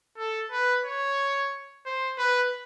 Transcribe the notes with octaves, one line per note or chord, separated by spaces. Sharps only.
A4
B4
C#5
C5
B4